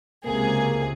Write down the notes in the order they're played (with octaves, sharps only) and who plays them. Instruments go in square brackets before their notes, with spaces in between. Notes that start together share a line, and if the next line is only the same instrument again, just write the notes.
[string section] C#2 C3 G#4 [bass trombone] A#3